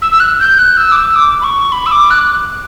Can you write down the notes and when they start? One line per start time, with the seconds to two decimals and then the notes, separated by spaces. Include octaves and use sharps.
0.02 E6
0.12 E6
0.20 F#6
0.40 G6
0.58 F#6
0.77 E6
0.92 D6
0.96 E6
1.16 D6
1.41 B5
1.44 C#6
1.72 B5
1.86 E6
1.92 D6
2.10 F#6